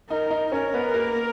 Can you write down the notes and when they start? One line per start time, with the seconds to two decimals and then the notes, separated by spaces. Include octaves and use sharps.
0.10 D#4 A#4
0.31 D#4
0.52 C#4 A#4
0.74 B3
0.94 A#3